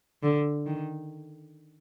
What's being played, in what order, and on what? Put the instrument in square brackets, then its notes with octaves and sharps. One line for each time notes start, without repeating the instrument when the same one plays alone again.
[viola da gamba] D3
D#3